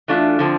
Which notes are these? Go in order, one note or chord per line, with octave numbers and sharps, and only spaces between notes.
E3 A3 D4 F4
D3 F3 C4